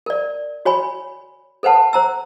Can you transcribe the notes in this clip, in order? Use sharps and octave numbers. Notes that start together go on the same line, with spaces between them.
A#4 D5
F#4 C#5 G#5 B5
A4 B4 C5 F#5 A5
C5 A#5 E6